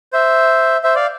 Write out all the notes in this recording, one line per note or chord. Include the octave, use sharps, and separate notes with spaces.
C5 E5
C5 E5
D5 F5